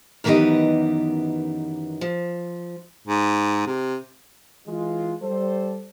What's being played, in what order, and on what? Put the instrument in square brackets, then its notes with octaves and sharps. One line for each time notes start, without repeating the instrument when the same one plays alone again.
[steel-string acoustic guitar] F#2 D#3 E3 B3 G4 D#5
F3
[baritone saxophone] G#2
C3
[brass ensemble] E3 G#3 F4
G3 A4 C5